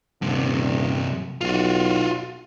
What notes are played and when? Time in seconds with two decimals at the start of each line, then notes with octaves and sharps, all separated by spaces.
0.22 D#1 G2 C3
1.41 B1 F4 F#4